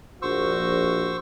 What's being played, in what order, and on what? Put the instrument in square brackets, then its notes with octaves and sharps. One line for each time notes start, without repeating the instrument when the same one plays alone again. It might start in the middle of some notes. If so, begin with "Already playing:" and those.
[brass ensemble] A#1 F#4 [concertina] C5 C#6 E6